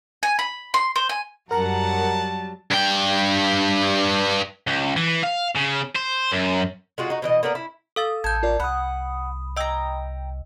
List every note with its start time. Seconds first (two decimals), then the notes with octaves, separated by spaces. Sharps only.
0.23 G#5
0.39 B5
0.74 C6
0.96 C5
1.09 G#5
1.51 F#2 F#3 G3 A#4 F#5 A5 A#5
2.71 G2 G5
4.67 C#2
4.97 E3
5.24 F5
5.56 C#3
5.95 C5
6.32 F#2
6.98 G#3 F4 F#4
7.10 D#4 F#4
7.22 B2 E3 D#5
7.43 A#3 B3 A#4 D5
7.55 E4
7.96 A4 F5 D#6 E6 A6
8.24 A1 A4 G6 G#6
8.43 F4 A#4 D5
8.60 C2 F#5 B5 D#6
9.57 D#5 G5 A#5 E6